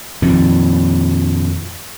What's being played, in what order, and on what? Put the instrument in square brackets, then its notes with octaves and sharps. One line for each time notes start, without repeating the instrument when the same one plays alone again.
[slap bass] F2 A#2 D#3